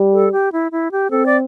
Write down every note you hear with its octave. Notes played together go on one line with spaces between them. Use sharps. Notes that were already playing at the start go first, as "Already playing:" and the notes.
Already playing: G3
A4
G4
E4
E4
G4
C4 A4
D5